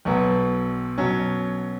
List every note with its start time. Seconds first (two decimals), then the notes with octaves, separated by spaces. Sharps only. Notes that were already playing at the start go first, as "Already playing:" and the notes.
0.05 B1 B2 F#3 B3
0.98 B2 F#3 C#4